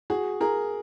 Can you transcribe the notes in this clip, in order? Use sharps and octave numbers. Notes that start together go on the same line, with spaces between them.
F#4 G#4
G#4 A#4